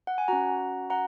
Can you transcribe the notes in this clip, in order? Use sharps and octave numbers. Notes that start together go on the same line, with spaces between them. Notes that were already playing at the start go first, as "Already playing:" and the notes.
F#5
G#5
C#4 F#4 F#5 A#5
F#5 A#5